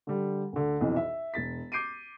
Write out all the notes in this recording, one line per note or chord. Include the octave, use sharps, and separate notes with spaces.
D3 G3
D2 D3
B1 F2 C3 E3
E5
E1 A6 B6
D6 G6 C7 D7 D#7